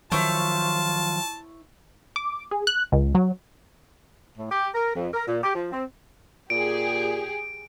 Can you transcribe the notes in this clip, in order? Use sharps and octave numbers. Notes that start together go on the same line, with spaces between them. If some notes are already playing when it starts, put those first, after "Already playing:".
D#3 F3 F#3 E4 F4 C5 C#5 A5
D6
G#4
F#6
C#2
F#3
A2
G4
A#4
F2
A#4
A#2
G4
F3
C4
A#2 G4 G#4 D7